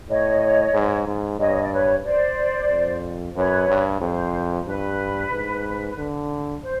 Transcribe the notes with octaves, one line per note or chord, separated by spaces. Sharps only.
A2 C#5 D#5
G#2
G#2
G2 C#5 D#5
D5
B4 C#5
C5 D5
F2
F#2 B4 C#5
G2
F2 C5
G2 B4
G#2
D3
C5